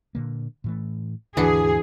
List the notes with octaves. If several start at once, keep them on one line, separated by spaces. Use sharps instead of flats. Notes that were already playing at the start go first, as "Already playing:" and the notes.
A#2 D3 A#3
A2 E3 A3
D#2 G#2 D3 E3 D4 F#4 G#4